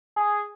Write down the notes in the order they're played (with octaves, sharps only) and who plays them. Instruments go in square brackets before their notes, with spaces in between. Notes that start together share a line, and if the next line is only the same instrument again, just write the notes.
[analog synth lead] G#4